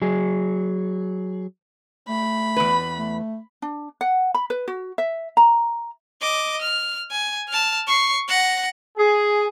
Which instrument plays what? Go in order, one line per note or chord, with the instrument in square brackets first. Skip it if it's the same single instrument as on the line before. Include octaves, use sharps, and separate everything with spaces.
[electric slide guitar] F#3 G#4
[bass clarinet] A3 [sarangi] B5
[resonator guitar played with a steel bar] E2 B4
[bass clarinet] A3
[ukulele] D4
F#5
B5
B4
F#4
E5
A#5
[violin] D#5 D6
F6
G#5
A5 F6
C#6 C7
F#5 A#6
[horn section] G#4